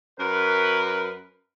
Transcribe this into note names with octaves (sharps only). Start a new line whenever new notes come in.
F#2 A#4 B4